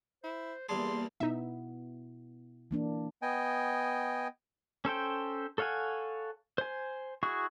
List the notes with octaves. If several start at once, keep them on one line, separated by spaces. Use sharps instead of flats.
E4 C5
E2 G3 A#3 G#4 A5 C6
B2 B3 D#4 E4 E5
E3 A#3 D4
B3 D#5 G5 G#5
C#4 A4 C5 G5
A4 C#5 F5 F#5 G#5
C5 G#5
E4 F#4 G#4 C#6